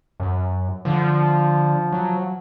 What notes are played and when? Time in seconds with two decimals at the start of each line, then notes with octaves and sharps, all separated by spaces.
0.20 F#2
0.85 D3 F3
1.92 F#3